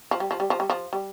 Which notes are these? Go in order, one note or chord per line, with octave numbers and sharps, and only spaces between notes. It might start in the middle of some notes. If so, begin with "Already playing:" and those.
F3
G3
F3
G3
F3
G3
F3
G3